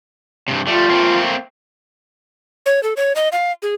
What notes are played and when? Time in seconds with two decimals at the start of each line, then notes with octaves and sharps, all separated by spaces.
0.48 G2 C3
0.67 G3 A3 F4
0.88 A3 A#3 C4
2.66 C#5
2.83 A4
2.97 C#5
3.16 D#5
3.32 F5
3.62 G#4